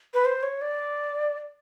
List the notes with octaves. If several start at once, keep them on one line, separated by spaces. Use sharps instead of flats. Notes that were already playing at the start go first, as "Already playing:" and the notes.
B4
C5
C#5
D5